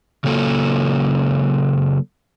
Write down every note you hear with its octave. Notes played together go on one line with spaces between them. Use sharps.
C#3 F#3 A#3 A4